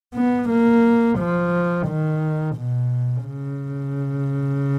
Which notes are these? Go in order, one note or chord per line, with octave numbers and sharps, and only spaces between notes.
B3
A#3
F3
D#3
B2
C#3